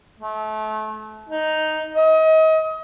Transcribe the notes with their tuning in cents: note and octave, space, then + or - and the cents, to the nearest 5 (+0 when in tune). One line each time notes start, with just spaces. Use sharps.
A3 -30
D#4 +0
D#5 +35